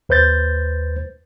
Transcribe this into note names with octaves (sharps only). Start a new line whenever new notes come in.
D#2 B4 C5 G6 A6